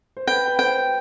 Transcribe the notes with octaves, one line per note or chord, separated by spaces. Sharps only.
C5
B4 G5
B4
C5 G5